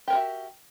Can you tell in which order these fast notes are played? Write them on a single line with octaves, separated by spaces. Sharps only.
G4 A#4 F#4 E5